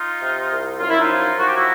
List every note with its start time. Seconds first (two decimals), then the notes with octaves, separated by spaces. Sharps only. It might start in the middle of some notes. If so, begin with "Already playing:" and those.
Already playing: D#4 F4
0.21 C3
0.51 C2
0.79 F#2 F4
0.90 E4
1.01 D#4 F4
1.09 F3
1.38 F#2 F#4
1.46 G4
1.55 E4 F#4